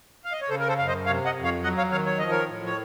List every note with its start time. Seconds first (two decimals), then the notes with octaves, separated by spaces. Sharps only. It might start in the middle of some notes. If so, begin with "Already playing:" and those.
0.25 F5
0.32 D#5
0.41 C#5
0.49 C#3 A4 C5
0.60 A#4
0.68 A4 C5
0.78 F#2 F5
0.87 C5 D#5
1.06 C3 C#5 F5
1.25 D#5 F#5
1.35 F2
1.44 C#5 F5
1.63 F#3 D#5 F#5
1.78 C#5 F5
1.91 D#3 C#5 F5
2.06 C#5
2.19 F3 D#5
2.31 A#4 C#5
2.48 A2
2.66 C#5